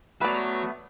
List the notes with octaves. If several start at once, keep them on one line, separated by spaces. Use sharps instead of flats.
F#3 A3 B3 B4 D5